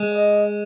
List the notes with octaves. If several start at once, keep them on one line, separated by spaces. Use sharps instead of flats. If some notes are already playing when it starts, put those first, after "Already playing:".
Already playing: G#3
D#5